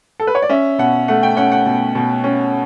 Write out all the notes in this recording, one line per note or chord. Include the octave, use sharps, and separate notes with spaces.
A4
B4
C#5
D5
C#4 E5
B2 F#5
A3 F#5
G5
C#4 F#5
F#5
B2
B2
C#4